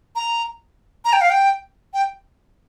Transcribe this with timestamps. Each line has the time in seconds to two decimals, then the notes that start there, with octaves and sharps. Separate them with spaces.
0.16 A#5
1.05 A#5
1.13 G5
1.21 F5
1.30 G5
1.94 G5